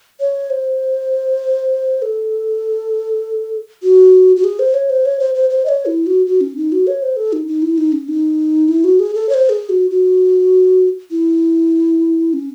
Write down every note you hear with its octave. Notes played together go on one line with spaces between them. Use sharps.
C#5
C5
A4
F#4
F#4
G#4
C5
C#5
C5
C#5
C5
C5
C5
D#5
C#5
E4
F#4
F#4
C#4
D#4
F#4
C#5
C5
A4
D#4
D#4
E4
D#4
C#4
D#4
E4
F#4
G#4
A4
C#5
C5
G#4
F#4
F#4
E4
C#4